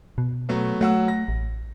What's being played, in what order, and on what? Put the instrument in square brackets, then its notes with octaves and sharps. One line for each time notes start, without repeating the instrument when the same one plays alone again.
[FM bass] B2
[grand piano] F#3 A3 B3
[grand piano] F#3 F#5 E6 [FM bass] A3
[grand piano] A#6
[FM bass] A1